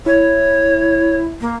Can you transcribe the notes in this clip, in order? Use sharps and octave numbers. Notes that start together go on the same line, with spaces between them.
E4 C#5
A#3